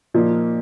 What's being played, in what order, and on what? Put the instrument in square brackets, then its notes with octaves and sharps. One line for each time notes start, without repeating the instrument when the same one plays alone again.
[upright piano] A#2 F3 A#3 D#4